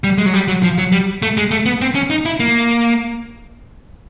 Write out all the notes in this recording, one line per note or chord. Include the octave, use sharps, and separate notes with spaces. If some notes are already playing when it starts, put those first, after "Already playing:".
G3
G#3
F#3
G3
F#3
F3
F#3
G3
A3
G#3
A3
B3
C4
C#4
D#4
E4
A#3